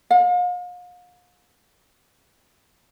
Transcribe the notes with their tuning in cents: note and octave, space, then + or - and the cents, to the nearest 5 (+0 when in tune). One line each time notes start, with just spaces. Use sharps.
F5 +40